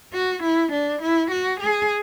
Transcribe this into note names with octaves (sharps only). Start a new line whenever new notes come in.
F#4
E4
D4
E4
F#4
G#4